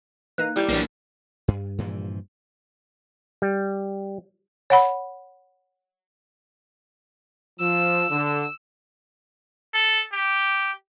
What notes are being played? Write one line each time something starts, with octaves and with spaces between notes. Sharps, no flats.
E3 A#3 D#4 F#6
G3 E4 D6 G6 E7
B1 E3 A#3 D4
G2
G2 A#2 E3 F3
G3
C#5 F#5 B5
F3 E6
D3
A4
G4